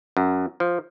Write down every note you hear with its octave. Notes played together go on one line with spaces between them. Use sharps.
F#2
F3